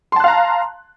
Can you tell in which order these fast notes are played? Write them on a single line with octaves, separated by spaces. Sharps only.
C6 A5 F#6 F5 A#5